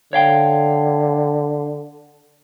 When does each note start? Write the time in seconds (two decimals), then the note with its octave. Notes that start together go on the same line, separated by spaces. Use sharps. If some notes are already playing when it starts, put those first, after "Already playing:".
0.13 D3 C#5 F5 G5